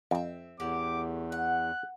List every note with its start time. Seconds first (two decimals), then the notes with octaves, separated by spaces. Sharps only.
0.11 F2 C4 E5
0.60 E2 A2 G4 F#5 D6
1.32 F#5 F#6